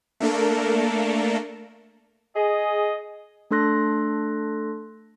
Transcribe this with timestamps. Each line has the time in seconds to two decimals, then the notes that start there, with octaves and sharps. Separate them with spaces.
0.20 A3 A#3 D4 A4 A#4
2.36 G#4 D#5
3.51 A3 D4 A4 C6 F#6 A#6